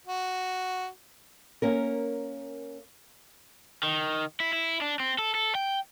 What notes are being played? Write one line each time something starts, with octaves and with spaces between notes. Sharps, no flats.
F#4
A#3 C#4 A#4
D#3
E4
E4
D4
C4
A4
A4
G5